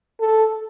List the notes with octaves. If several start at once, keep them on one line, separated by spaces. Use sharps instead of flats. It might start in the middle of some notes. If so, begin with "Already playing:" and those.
A4